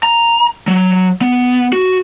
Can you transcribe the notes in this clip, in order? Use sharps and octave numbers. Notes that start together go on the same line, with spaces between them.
A#5
F#3
B3
F#4